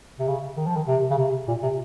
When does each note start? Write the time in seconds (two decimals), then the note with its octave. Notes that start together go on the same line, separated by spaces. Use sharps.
0.20 C3
0.28 C#3
0.57 D#3
0.67 F3
0.76 D#3
0.87 C3
1.10 C#3
1.18 C3
1.48 A#2
1.63 C3